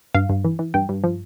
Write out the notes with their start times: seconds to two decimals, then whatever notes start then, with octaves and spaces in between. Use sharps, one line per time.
0.15 G2 F5
0.30 G2
0.44 E3
0.59 E3
0.74 G2 G5
0.89 G2
1.04 F3